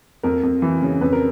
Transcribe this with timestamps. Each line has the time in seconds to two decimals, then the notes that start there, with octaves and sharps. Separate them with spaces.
0.23 F2 A#4
0.43 F2
0.62 E3
0.82 C#3
1.01 F2 B4
1.12 A#4